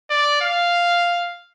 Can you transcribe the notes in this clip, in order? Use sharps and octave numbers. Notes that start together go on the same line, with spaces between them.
D5
F5